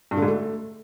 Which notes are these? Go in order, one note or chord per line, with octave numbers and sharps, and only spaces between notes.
G2
D3
G#2
A3